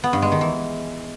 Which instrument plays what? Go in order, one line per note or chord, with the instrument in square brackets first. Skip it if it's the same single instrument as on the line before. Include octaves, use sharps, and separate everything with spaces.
[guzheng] B3
G2
G#3
D#3
E3